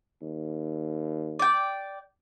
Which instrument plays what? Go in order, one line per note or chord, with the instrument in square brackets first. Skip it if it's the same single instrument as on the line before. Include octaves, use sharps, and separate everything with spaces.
[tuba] D#2
[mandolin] D5 G5